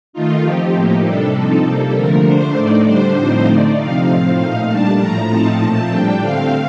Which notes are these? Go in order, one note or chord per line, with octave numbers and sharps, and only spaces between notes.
D#3 A3 D#4 F4
F3 C4 D#4 G4
A2 F3 A#3 D#4
C3 G3 D4 A4
F3 C4 D#4
C3 G3 A#3 A4
D3 F3 A3 A#4
D3 A3 D4 C5
A2 A3 D#4 D5
D3 G3 D4 C5
A2 F3 C4 D#4
D3 A3 D#4 D5
C3 F3 C4 D#4 F5
A2 F3 C4
A#2 A3 D#4 F5
A#2 G3 D4 A5
A2 F3 A3 A#5
A2 F3 C4 D#4 A5
A#2 F3 A3 C4
A2 G3 D4 G5
D3 A3 C4 F5